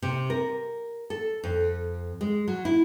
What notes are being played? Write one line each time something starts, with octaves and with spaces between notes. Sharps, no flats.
C3
A#4
A4
F2
G#3
F#3
E4